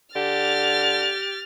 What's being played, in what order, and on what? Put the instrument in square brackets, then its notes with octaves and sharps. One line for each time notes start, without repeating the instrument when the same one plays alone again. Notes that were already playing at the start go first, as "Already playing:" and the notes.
[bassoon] D3 [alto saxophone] G4 [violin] F6 A6